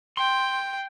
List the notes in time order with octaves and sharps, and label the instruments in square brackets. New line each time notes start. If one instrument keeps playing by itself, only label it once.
[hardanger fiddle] G5 [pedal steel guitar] C6